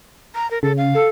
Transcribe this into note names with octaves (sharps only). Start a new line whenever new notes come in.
A#5
A#4
C#3 A4
F5
A4